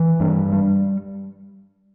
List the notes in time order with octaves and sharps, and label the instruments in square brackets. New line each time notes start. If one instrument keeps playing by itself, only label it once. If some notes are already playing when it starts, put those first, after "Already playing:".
Already playing: [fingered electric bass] E3
G2
G3